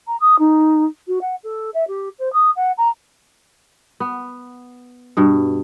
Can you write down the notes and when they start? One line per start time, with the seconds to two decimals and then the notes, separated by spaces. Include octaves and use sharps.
0.07 A#5
0.20 D#6
0.39 D#4
1.07 F#4
1.21 F#5
1.43 A4
1.74 E5
1.88 G4
2.19 C5
2.33 D#6
2.56 F#5
2.78 A#5
4.00 B3
5.17 G2 B2